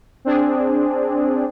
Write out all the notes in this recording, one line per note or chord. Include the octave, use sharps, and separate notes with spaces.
C4 D4 G#4